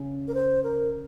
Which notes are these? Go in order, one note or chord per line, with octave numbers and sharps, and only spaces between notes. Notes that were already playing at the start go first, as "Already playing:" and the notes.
Already playing: C#3
A#4
C5
A#4